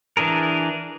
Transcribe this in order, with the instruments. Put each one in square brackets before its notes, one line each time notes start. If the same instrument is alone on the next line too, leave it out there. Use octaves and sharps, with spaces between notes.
[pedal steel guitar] E3 D4 G#4 A#4